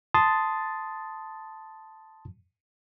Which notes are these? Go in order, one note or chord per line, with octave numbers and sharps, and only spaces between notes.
A5 C6 D#6 A6